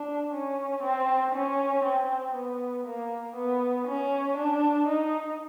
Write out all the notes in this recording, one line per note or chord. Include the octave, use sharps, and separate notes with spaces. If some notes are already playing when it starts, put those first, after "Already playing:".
Already playing: D4
C#4
C4
C#4
C4
B3
A#3
B3
C#4
D4
D#4